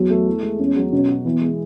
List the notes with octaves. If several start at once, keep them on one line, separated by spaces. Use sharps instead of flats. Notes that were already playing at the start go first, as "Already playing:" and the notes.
Already playing: E2 F#3
A3
E4
G#3
E2 C#4
F#3
B2 C#4
F#4
E3 B3
G#3